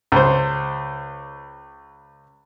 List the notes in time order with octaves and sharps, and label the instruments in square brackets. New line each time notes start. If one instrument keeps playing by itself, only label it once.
[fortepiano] C#2 C5